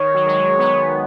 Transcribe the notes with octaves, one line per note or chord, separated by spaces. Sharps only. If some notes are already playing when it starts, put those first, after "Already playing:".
Already playing: D#3 C#5
F#3
G#3
F#3
B3